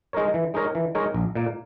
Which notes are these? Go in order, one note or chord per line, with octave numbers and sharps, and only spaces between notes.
G#3 D#4 A#4 C#5
E3
G#3 D#4 A#4 C#5
E3
G#3 D#4 A#4 C#5
A#1
A#2 A#3